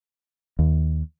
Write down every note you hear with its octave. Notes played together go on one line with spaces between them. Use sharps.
D#2